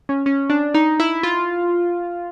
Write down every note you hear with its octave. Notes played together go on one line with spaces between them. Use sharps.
C#4
C#4
D4
D#4
E4
F4